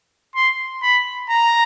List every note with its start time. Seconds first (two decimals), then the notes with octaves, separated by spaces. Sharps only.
0.36 C6
0.82 B5
1.29 A#5